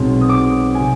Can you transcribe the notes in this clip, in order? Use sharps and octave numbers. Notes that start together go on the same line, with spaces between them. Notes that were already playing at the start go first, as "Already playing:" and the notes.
Already playing: B1 B2 G#3 C4
D#6
D6
G#5
C3